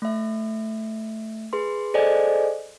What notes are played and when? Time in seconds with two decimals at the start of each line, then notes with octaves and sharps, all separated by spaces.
0.02 A3 E5
1.53 G#4 B4 C6
1.94 G#4 A4 C5 D5 D#5 G#5